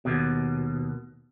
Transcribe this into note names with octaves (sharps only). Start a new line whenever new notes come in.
D#2 B2